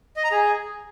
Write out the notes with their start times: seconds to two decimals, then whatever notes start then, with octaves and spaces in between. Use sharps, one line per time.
0.16 D#5
0.24 A#5
0.32 G#4